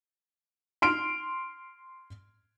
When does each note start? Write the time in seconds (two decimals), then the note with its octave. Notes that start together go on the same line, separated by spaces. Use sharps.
0.82 C6 F6 D7